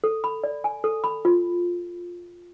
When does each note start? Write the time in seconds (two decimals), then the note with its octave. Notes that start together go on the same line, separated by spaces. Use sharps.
0.04 A4
0.24 B5
0.44 D5
0.64 G#5
0.84 A4
1.04 B5
1.25 F4